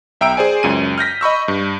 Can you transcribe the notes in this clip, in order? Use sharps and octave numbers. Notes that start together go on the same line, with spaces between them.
B1 E5 G5 A#5 E6 D7
G#4 C5 D5 G#5
C#2 F#2 D#7
F6 G6 A#6 B6
D#5 B5 C#6 E6
G2